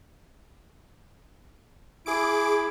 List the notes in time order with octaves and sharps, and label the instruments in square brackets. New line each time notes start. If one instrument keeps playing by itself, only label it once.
[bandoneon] E4 [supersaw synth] G#4 D6 D7